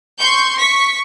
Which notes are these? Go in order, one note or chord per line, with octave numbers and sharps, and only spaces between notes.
C6 C#6 G6
C#6 B6